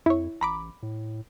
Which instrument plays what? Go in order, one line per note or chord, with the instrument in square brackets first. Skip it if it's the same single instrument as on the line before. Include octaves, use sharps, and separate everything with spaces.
[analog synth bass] F2 [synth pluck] E4 C#5
[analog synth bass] A1 [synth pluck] A#5 B5 D6
[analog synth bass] A2